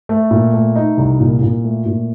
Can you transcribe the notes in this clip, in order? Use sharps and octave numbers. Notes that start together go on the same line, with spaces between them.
A3
A#2
A3
D#4
C2
A#2
A#2
A3
A#2